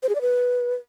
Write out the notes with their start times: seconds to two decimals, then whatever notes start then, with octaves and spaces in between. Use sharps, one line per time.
0.03 C5
0.09 G#4
0.15 D5
0.21 B4